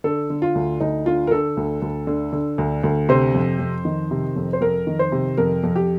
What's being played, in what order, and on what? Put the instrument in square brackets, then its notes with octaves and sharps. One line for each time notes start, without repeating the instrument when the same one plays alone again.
[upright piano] D3 A4
D3
F4
D2
D2 D#4
D3 F4
A#4
D3 A4
D2
D2
D3
D3
D2
D2
C3 C5
F2
F2
D#3
C3
F2
C5
F2 A#4
D#3
C5
C3
F2 A#4
F2
G4